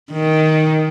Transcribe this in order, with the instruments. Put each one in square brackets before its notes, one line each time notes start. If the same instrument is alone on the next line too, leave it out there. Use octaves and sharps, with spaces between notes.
[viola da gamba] D#3